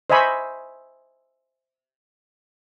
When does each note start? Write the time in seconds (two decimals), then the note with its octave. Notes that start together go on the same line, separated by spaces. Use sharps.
0.10 C5 D#5 E5 G#5 B5 C#6